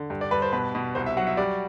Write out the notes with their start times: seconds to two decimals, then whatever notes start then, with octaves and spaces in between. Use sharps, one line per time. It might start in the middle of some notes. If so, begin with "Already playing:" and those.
Already playing: D3
0.10 G2
0.21 D5
0.31 G2 B4
0.42 C5
0.53 B2 B4
0.75 B2
0.95 C2 C5
1.06 E5
1.17 F#3 F#5
1.27 E5
1.37 G3 D5